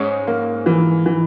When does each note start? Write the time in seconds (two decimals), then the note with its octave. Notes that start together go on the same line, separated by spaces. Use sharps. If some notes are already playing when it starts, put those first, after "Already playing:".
Already playing: G#2 C#4
0.27 A#3
0.66 E3
1.06 E3